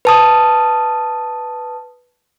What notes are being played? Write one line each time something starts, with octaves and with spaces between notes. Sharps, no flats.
B4 A5 D#6